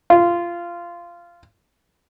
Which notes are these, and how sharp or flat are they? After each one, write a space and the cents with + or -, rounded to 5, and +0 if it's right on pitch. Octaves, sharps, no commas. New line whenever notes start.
F4 -15